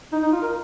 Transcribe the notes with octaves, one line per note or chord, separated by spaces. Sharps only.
D#4
D#4
F4
A#4